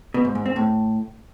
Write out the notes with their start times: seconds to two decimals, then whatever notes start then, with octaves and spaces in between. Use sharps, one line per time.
0.14 B2
0.25 G#2
0.35 G#2
0.46 C4
0.56 A2